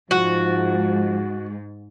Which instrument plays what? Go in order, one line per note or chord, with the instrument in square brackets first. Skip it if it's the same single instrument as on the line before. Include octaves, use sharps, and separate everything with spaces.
[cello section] G#2 [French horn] F3 [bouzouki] F#4